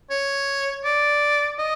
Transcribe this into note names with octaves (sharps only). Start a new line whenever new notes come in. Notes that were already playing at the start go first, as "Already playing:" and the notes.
C#5
D5
D#5